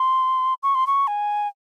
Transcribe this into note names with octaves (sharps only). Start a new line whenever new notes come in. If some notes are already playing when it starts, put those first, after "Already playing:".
Already playing: C6
C#6
C6
C#6
G#5